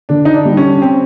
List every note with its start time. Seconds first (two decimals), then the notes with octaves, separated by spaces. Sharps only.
0.09 D3 D4
0.25 D#4
0.34 D4
0.45 G3
0.57 C#4
0.82 C4